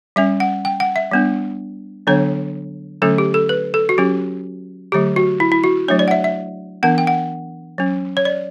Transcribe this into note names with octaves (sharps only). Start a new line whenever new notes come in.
G3 C#4 E5
F#5
G5
F#5
E5
G3 B3 D4
D3 F#3 B3 D4 C#5
D3 F#3 A3 C#4 A4
G4
A4
B4
A4
F#4
F#3 C#4 G4
D3 F#3 A3 G4
F#4
E4
E4
F#4
F#3 A3 D4 C#5
D5
F#5
E5
E5
E3 B3 D4 F#5
G5
F#5
F#3 C#4
C#5
D5